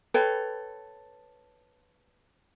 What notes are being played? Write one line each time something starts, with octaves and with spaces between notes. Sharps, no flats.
A4 B4 C#5 G5